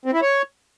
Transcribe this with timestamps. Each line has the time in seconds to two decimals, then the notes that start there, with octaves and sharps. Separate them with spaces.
0.05 C4
0.14 E4
0.22 C#5